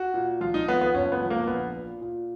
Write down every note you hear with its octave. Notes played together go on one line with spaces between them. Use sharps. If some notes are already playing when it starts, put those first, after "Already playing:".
Already playing: F#4
A#2
F3 F4
D#4
F3 B3
B3
F#1 C#4
B3
F3
A#3
A#1 B3
A#2
A#2